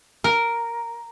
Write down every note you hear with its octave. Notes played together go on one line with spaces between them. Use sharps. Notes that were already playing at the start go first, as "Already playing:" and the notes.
A#4